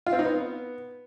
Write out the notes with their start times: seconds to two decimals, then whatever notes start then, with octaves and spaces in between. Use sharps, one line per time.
0.06 F4
0.13 C4
0.19 D#4
0.25 B3